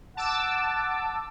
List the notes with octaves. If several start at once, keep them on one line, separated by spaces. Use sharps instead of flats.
F#5 A5 D6 E6